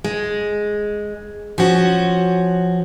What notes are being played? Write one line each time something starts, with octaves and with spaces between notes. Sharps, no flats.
G#3
F3 C#4 F#4